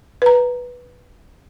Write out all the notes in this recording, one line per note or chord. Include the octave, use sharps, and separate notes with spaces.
B4 A#5